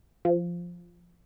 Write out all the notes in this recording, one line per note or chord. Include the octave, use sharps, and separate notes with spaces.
F3